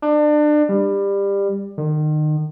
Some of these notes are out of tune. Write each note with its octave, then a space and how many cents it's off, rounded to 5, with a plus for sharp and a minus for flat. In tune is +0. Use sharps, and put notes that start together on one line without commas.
D4 +30
G3 +20
D#3 -35